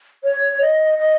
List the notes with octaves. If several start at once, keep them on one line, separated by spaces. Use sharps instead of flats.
C#5
D#5
D#5